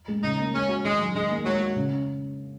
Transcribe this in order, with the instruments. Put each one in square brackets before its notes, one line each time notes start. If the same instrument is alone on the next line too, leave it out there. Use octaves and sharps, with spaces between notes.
[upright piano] G#3
[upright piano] C#3 [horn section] D#4
[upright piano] A#3
[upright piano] G#3 [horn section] C#4
[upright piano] F#4
[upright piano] D#3 [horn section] G#3
[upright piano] F#3
[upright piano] D#3 [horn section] G#3
[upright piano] A#3
[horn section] F#3 [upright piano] G#3
[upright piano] F#4
C#3